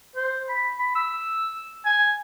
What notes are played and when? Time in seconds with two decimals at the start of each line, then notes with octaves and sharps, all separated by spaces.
0.16 C5
0.49 B5
0.79 B5
0.96 E6
1.85 G#5